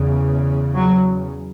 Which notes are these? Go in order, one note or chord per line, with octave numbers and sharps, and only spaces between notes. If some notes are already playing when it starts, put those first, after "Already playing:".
Already playing: E2 C#3
F#3